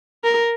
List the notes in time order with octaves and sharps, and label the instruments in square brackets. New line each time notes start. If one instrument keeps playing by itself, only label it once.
[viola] A#4